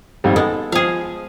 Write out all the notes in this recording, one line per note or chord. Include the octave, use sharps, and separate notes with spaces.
G#1 F2 G3
G#3 B3 A4
F3 G#4 F5